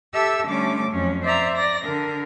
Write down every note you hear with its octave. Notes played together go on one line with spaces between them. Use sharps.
G4 A4 E5 E6
D3 G3 A3 C#4 D6
F2 F#3 C#4
C5 D5 E5 A#5
D5 A#6
D3 A#4